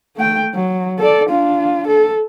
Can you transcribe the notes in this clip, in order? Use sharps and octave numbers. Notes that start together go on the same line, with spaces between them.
A3 G5
F#3
A4 D5
D4 F4
A4